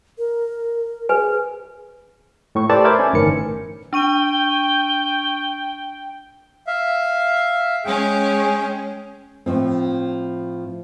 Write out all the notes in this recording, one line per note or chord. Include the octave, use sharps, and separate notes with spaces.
A#4
G#4 B4 G#5
A2 C#6
G4 A4 B4 C5 D5 A5
A#4 C5 E5 B5 D6 G#6
C#4
G1 A2 D#3 E3 A#4 C#7
D4 G5 C#6 D#7
E5 F5
G#3 C#4 G#4 G5
A2 F3 C4